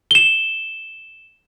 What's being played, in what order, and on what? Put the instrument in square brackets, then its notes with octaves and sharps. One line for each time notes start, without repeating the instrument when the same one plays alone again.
[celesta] E7 G7